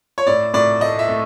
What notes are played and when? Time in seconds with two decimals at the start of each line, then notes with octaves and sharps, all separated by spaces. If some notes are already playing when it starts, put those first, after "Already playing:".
0.18 C#5
0.27 A2 D5
0.54 A2 D5
0.81 A3 D#5
0.99 E5
1.08 A3